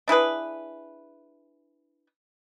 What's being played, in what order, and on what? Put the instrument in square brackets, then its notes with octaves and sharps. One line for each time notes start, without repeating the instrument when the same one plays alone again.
[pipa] D4 E4 G#4 B4